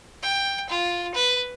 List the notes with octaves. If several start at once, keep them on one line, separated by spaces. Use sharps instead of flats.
G5
F4
B4